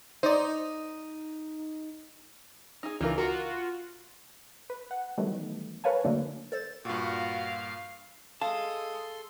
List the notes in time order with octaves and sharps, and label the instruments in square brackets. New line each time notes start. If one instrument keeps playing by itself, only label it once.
[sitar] D#4 [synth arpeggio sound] C5 D5
[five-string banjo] D#4 G#4
[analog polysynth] C#2 D#3 E3 [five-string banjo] D4 F4 A#4
[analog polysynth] F4 F#4 [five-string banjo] A#4
[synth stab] B4
F#5
D#3 E3 F#3 G3 A3 B3
A#4 B4 C#5 F5 G#5 A5
D3 F#3 A3 A#3 D4
[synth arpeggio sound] A4 C5 [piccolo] A6
[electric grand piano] G2 A#2 [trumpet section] F4 F#4 [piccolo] F5
[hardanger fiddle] G#3 D#6 [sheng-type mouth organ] A4 C6 [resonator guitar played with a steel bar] F5 [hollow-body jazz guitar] A5